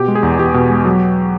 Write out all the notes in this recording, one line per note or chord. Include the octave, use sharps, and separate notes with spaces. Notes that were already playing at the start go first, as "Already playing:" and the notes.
Already playing: B2 G4
G#3
G#4
E2
E2 G4
B2
G#3
F#3